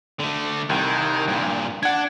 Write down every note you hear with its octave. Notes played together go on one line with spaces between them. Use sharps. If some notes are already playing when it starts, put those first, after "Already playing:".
D3 A3
C2 D#3
G2 A#2
D4 F#5 G#6